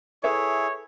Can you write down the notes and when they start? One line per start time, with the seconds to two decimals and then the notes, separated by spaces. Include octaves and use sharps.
0.24 E4 G#4 A4 B4 C#5 E5